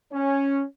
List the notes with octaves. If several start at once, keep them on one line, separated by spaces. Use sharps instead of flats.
C#4